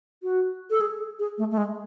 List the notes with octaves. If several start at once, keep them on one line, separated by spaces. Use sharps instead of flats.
F#4
A4
G#4
G#4
A3
A3
G#3